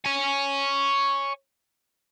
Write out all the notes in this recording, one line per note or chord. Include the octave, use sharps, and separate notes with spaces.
C#5 G#5